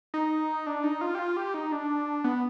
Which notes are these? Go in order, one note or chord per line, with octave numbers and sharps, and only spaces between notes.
D#4
D4
D#4
F4
G4
F4
G4
D#4
D4
B3